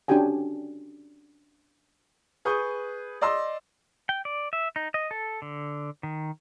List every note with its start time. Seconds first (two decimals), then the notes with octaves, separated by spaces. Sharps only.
0.08 C#4 D4 F#4 G4 G5 G#5
2.45 G#4 B4 C#6 D#6 G6
3.21 D5 D#5 C6 E6
4.09 G5
4.25 D5
4.53 E5
4.76 D#4
4.94 D#5
5.11 A4
5.42 D3
6.03 D#3